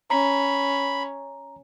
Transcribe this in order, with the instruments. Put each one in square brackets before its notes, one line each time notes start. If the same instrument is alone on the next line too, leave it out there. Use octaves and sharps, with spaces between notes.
[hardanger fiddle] C#4 [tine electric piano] A#5 [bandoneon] B5